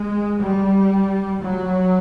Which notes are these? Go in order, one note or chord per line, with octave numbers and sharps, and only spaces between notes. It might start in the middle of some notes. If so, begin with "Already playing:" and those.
Already playing: G#3
G3
F#3